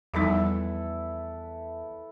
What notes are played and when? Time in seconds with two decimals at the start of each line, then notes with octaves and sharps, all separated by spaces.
0.14 E2 F3 G3 D#4 E4 A4 B4